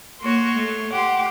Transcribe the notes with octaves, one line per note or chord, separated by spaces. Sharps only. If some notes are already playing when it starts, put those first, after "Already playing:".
A#3 F#4 C#5 C6
A3
G4 F#5 C6